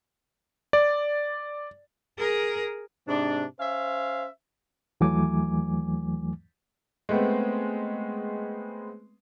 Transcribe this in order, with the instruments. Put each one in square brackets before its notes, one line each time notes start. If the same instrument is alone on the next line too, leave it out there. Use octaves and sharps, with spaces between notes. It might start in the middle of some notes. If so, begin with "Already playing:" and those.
[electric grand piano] D5
[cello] G#4 A#4
[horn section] G#2 C3 D4
C#4 C5 E5 F5
[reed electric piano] D#2 E3 F#3 A3 G#5 D6
[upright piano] G#3 A3 B3 C4